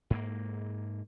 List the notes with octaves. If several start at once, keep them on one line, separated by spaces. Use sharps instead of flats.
G#2 A#3